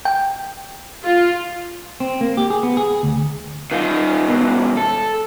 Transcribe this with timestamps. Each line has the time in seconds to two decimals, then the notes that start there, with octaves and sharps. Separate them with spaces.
0.05 G5
1.03 F4
2.00 C4
2.21 A#3
2.37 G4
2.50 G#4
2.63 B3
2.77 G#4
3.03 D2
3.72 D#3 F4
4.27 D#2 B2
4.77 A4